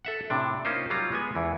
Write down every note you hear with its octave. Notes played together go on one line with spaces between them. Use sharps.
A4 E5 F#5
A2 C3 D4
A#3 C#4 D#4 F4 C5
F#3 G3 F4 F5 A#5
G#3 B3 G#5
E2 E3